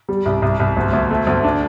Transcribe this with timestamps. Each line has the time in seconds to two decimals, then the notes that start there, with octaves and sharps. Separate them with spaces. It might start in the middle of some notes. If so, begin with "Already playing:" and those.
0.09 G3
0.26 C2
0.42 C2
0.60 C2
0.77 D2
0.93 D2
1.11 A3
1.27 D2
1.44 D4